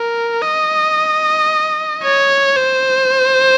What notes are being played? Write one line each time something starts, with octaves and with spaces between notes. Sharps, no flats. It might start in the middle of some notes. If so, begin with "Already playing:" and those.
Already playing: A#4
D#5
C#5
C5